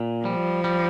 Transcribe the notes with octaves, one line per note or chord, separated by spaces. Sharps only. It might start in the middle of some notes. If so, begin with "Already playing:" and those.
Already playing: A#2
F3 G3
G3